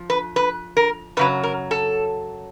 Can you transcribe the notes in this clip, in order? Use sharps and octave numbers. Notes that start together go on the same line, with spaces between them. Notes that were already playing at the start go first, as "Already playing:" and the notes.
Already playing: F3
B4
B4
A#4
F#2 C#3 F#3 B4
A#4
A4